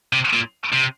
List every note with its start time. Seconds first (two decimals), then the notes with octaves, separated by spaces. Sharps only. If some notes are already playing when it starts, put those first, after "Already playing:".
0.13 C3
0.33 A#2
0.73 C3